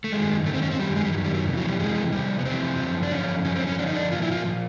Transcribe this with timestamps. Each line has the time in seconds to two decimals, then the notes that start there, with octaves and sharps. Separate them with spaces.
0.04 A3
0.12 F#2 D#3 G#3
0.46 F#2 A3
0.50 D#3 C4
0.62 C#4
0.71 C4
0.80 F#2 D#3 G3
0.96 G#3
1.05 G3
1.12 F#2 F#3
1.18 D#3
1.24 G3
1.35 F#3
1.46 F2 C3 E3
1.57 F#3
1.68 G3
1.79 F2 C3 E3 G#3
2.12 F2 C3 G3
2.39 B3
2.45 F2 C3 E3 C4
2.78 F#2 D3 F3
3.03 D4
3.11 F#2 D3 F3 C#4
3.44 F#2 D3 F3 C#4
3.55 C4
3.67 C#4
3.78 F#2 D3 F3 D4
3.87 D#4
3.96 D4
4.11 A#2 F3 F4
4.22 E4
4.31 F4
4.45 A#2 F3